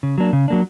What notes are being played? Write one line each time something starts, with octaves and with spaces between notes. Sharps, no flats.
C#3
F#3 A#3 D4
C#3
F#3 A#3 D4